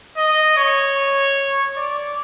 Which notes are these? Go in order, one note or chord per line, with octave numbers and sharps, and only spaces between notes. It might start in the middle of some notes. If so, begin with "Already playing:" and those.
D#5
C#5
D5